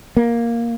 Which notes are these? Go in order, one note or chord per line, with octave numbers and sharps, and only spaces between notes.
A#3